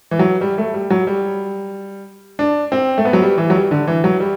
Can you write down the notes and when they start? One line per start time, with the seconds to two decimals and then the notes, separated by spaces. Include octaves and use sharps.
0.11 E3
0.19 F#3
0.41 G3
0.58 A3
0.74 G3
0.90 F#3
1.07 G3
2.39 D4
2.72 C4
2.98 A3
3.05 B3
3.13 F#3
3.22 G3
3.38 E3
3.50 F#3
3.54 G3
3.71 D3
3.87 E3
4.04 F#3
4.20 G3